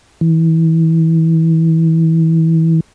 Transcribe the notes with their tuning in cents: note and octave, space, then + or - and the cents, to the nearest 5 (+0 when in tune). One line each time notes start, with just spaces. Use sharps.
E3 -25